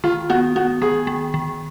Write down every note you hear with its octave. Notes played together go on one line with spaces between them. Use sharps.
D#3 F4
B3 F#4
B3 F#4
D#3 G#4
D#3
D#3